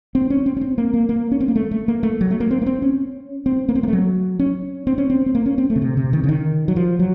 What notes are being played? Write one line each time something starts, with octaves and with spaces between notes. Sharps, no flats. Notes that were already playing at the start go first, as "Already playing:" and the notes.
C4
C#4
C4
C#4
C4
A#3
A#3
A#3
C#4
C4
A#3
A3
A3
A#3
A3
F#3
A3
A#3
C4
A#3
C4
C#4
C4
A#3
C4
A#3
A3
F#3
C#4
C4
C#4
C4
C4
A#3
C#4
C4
A3
C#3
C3
C3
D#3
C#3
D#3
F#3
F3
F#3